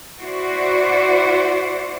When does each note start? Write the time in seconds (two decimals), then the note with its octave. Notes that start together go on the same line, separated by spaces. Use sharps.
0.20 E4 F#4 C5 D5